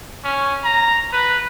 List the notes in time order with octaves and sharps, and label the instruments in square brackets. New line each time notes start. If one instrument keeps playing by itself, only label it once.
[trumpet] C#4
A#5
B4